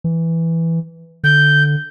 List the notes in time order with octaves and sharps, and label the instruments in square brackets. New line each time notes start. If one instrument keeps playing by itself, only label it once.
[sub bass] E3
[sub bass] D3 [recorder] G6